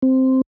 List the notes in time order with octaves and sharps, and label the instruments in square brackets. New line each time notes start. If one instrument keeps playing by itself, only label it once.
[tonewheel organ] C4